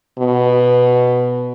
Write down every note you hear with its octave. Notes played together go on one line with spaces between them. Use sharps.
B2